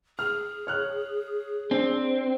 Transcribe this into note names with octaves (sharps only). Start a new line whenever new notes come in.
G#4 F6
C#5 F6 F#6
C4 D4